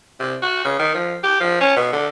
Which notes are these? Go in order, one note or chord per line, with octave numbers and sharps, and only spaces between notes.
C3
F#4
C#3
D#3
F3
G4
F3
C#4
B2
D3